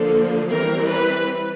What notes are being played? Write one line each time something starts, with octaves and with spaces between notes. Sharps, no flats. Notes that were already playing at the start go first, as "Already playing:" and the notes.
Already playing: D3 F3 A#3 A4
E3 G3 C4 A#4
B4